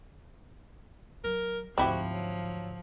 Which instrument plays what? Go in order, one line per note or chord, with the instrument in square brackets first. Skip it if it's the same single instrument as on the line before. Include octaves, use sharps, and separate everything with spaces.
[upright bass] F#3 [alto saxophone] A#4
[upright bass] D2 G#2 [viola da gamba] F3 [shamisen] C4 E4 G4 [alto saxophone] F#4
[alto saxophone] F#3